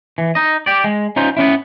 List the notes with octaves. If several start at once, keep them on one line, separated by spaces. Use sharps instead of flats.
E3
D#4 D#5
G4 D5
G#3
C#4 D#4 F4 C5
B3 C#4 E4